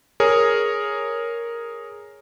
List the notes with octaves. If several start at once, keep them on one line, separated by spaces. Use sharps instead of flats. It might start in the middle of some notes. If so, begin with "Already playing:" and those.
G#4 A#4 C#5